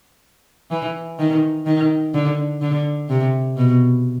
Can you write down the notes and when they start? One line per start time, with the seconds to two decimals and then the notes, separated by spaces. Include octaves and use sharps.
0.70 E3
1.19 D#3
1.66 D#3
2.14 D3
2.61 D3
3.09 C3
3.57 B2